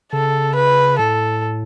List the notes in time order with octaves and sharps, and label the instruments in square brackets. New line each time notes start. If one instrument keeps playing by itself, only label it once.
[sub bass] C#3 [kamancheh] A4
[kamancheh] B4
[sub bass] A2 [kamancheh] A4